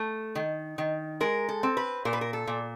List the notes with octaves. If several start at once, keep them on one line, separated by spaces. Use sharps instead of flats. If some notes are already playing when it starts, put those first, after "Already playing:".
Already playing: A3
D#3
D#3
G#3 A#4
A4
C4
B4
A#2 A#4
B4
A#4
A4
A#2